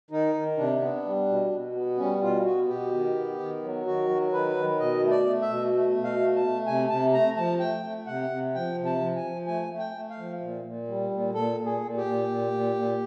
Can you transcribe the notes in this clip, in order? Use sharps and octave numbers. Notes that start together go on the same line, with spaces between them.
D#3 D#4
D#3
C3 D4
B3
G3
B2
B2
B3
G3 C#4
B2 F4
B3 F#4
B2 G4
D#3
B3
D#3
F#3
D#3 F#4
F#3
D#3 B4
D#3
B2 D#5
A3
D5
A3
E5
B2
A3
B2
F5
A3
A5
A3
C3 G#5
C3 A5
A3 A#5
F3 A5
A3 G5
A3
C3 F#5
C3
F3 G5
C3
A5
F3
G#5
F3
A3 G#5
A3
G5
A3
F5
F3
A#2
A#2
G3
A#2
A#2 A4
A#2
G#4
A#2
G4
A#2
A#2
A#2
A#2